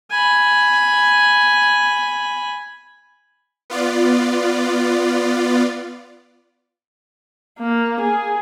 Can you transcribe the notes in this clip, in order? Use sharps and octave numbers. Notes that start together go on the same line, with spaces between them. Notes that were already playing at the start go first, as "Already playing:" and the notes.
G#5 B5
B3 F4 D5
A#3
G#4